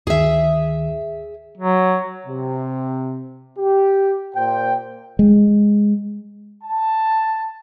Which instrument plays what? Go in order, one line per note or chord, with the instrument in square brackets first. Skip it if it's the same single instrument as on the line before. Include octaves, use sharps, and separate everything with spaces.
[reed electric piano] D2 D#3 [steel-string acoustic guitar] G#4 E5
[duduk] F#3
[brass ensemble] C3
G4
A#2 C5 G5
[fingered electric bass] G#3
[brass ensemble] A5